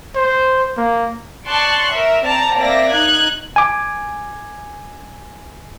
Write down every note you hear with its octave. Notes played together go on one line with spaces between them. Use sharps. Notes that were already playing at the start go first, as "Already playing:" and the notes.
C5
A#3
D5 A5 C6 C#6 F#6
A#4 E5
C4 D5 A5 A#5
A#3 C4 D5 E5 A#6
D#4 F#6 G#6
G#5 D6